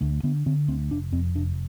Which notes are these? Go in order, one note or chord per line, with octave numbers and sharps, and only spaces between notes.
D2 A3
D3 B3
D3 C4
D2 C4
F1 D4
F2 C4
F1 D4